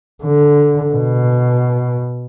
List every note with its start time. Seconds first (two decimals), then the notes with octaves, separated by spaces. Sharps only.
0.23 D3
0.94 B2